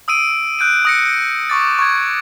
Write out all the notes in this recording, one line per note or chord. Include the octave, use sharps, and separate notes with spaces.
D#6 E6 D7 D#7
F#6 G6 D7 D#7
D#6 A#6 C#7
C#6 D6 A6
C#6 G#6